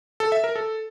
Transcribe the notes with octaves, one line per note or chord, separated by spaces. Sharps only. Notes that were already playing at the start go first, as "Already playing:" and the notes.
A4
E5
A#4
A4